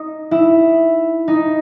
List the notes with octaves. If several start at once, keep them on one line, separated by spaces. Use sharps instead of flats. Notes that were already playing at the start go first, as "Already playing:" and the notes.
Already playing: D#4
E4
D#4